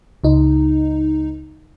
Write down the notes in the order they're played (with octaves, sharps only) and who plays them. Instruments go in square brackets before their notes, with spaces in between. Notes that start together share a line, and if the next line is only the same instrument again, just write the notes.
[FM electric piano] C#2 D#4